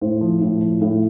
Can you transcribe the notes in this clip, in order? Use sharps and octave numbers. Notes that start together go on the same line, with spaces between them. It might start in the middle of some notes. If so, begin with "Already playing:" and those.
A2 C5
F3
A2
F3
A2